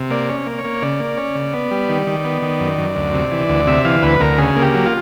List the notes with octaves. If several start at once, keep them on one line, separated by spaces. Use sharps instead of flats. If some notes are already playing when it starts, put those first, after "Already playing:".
Already playing: C3
A#3 D5
C#4
A#3
C#5
A#3
C#3 D5
A#3
C#4
C#3
B3
G3
D#3
D#3
B3
D#3
F#2
F#2
D2
C3
E3
D2
C3 E5
E3 F5
D2 B4
D2 A#4
C#3 G#4
A#3
G4
F#3
F4